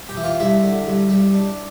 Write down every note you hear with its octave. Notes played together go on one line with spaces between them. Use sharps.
G4 G5
E3
F4 F5
G2 E4 E5
D3
G2
G3
D4